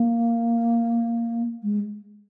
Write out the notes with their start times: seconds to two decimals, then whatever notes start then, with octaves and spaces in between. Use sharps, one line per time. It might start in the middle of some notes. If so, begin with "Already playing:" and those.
Already playing: A#3
1.63 G#3